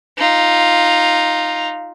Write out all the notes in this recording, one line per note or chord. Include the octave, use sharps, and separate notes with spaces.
D#4 F4